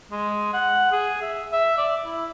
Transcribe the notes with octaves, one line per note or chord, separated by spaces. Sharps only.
G#3
F#5
G#4
E5
E5
D5
E4